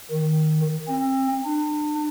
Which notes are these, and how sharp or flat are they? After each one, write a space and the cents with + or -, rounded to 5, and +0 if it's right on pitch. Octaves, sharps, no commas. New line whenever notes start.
D#3 +0
C4 +30
D4 +35